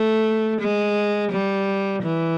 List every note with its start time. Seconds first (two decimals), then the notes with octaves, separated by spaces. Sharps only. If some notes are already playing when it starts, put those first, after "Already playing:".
Already playing: A3
0.61 G#3
1.32 G3
2.02 E3